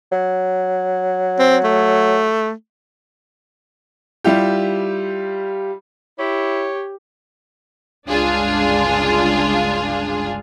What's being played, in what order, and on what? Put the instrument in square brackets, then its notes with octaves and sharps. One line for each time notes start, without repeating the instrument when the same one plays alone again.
[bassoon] F#3
[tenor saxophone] C4
A3
[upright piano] G3 E4 F4 G4
[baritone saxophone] E4 [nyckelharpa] G4 [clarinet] C#5
[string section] G1 C#2 D4 F4 G#4